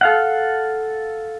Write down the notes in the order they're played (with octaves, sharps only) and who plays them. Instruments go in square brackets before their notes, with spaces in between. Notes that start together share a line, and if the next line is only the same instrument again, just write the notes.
[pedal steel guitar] A4 F5 F#5